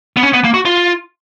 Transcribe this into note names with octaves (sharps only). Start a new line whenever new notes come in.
B3
C#4
B3
A#3
F#4
F4